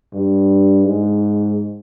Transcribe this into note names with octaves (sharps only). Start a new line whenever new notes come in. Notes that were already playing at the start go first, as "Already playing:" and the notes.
G2
G#2